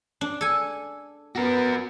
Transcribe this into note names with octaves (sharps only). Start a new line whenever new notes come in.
D4
A4 G#5
B3 F#4 A#4